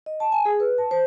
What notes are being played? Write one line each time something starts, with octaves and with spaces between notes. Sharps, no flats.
D#5
A5
G#5
G#4
B4
A5
C5